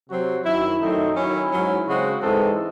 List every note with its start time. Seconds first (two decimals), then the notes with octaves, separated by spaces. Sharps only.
0.10 C3 F#3 C4 F#4
0.45 F#2 D#3 F#3 E4
0.81 F#2 D#3 F#3 A3 C4 D#4
1.15 D#3 F#3 C#4 E4
1.51 G#2 F#3 C#4
1.86 C#3 G#3 C4 F#4
2.21 G#2 E3 G#3 C4 A4